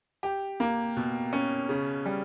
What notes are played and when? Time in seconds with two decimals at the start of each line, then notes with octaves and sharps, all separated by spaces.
0.23 G4
0.60 A#3
0.97 B2
1.33 C#4
1.69 C#3
2.06 G3